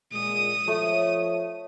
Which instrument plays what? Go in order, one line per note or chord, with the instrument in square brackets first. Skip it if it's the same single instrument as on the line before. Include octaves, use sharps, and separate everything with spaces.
[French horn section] A#2 G#3 [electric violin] D#6
[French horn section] F3 C#5 [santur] A3